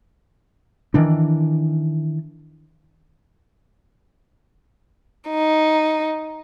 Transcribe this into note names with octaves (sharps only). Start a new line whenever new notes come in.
D#3 E3 D4
D#4